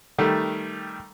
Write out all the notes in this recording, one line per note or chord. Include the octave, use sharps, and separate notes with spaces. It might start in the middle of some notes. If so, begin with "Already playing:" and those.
D#3 G3 A3